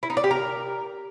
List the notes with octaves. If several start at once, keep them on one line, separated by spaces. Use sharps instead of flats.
E4
D#4
D5
G4
A#4